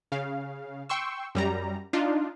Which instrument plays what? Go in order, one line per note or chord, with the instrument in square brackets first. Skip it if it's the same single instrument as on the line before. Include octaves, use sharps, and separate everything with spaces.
[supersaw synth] C#3 F5
G5 C6 C#6 E6
F#2 G3 A#5
D4 D#4 F4